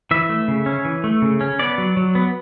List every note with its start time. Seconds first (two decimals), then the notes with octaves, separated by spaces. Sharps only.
0.11 E3 E5
0.29 A3
0.48 C#3
0.66 C#4
0.85 E3
1.04 A3
1.22 C#3
1.41 C#4
1.59 B3 D5
1.78 F#3
1.97 F#3
2.15 B3